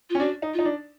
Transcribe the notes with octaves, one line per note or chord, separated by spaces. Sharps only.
F4
C#4
D4 F#4
D#4
F4
D#4
D4